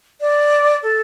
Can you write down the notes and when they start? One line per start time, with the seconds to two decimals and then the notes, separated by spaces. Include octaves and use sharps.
0.21 D5
0.83 A4